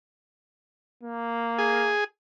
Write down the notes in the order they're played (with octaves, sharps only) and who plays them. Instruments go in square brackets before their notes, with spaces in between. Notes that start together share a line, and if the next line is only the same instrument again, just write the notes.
[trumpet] A#3
[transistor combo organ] G#4